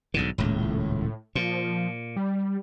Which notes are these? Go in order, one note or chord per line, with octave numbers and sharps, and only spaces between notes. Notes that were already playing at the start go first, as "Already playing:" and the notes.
B1 G#2 D3
D#1 C#2 A2
A#2 F3
G3